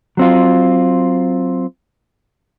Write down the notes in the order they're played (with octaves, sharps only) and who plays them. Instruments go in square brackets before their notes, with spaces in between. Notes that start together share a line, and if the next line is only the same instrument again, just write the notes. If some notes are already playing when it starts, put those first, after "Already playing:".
[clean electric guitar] F#3 C4 F4